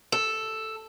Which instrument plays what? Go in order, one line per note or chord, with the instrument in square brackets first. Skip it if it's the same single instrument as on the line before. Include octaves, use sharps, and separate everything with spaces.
[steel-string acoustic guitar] A4